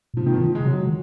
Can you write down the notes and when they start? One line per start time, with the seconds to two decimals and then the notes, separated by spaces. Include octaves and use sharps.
0.14 A#2
0.17 C3 F3
0.26 D#3
0.33 F3
0.40 D#3
0.55 C3 G#3
0.64 C#3 F#3
0.87 D#3